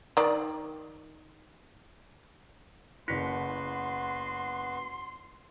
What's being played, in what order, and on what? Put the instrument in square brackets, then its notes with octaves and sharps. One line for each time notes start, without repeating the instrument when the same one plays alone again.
[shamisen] D#3 D5
[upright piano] F#1 B6 [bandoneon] B3 F#4 B4 [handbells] E4 [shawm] C6